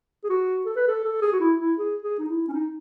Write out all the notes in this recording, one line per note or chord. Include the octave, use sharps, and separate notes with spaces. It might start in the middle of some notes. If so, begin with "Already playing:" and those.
G#4
F#4
A4
B4
A4
A4
G#4
F#4
E4
E4
G#4
G#4
D#4
E4
C#4
D#4